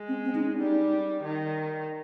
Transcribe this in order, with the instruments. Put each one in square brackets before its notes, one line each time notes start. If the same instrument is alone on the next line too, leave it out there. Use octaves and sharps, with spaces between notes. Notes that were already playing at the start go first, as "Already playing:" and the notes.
Already playing: [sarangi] G#3
[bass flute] C4
C4
D#4
C#4
[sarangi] G3 [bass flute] D#4
[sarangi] D#3